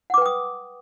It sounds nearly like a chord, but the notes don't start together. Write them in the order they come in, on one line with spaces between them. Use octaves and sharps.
F#5 D6 B4 G5 D#6